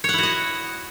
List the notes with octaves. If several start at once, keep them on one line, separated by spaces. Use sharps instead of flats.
E4 F#4 C#5 D#5 F#5